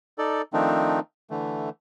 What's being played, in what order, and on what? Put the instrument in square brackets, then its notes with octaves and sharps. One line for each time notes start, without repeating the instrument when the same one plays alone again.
[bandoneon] D#4 A4 D5
D#3 F3 A3 C4 D4 D#4
D3 E3 A3